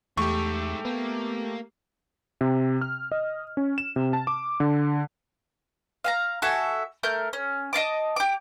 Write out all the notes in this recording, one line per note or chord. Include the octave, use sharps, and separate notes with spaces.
E2 G#2 A3 G4 A4 C#6
A#3 B3
C3
F6
D#5
C#4
E7
C3
A5
D6
D3
F5 G#5 A#5
F#4 A4 E5 G#5
A3 A#4 G6
C#4
D#5 F5 A5 D6
G4 D6